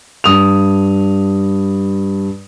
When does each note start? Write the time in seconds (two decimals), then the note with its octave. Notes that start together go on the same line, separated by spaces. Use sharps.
0.24 G2 D#6 F7